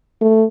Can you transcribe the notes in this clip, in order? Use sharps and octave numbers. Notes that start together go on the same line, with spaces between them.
A3